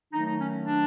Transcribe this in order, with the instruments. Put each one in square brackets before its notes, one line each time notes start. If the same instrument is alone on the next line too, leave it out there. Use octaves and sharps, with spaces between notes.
[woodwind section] D#3 F#3 A3 D#4
D#4
C#4
D4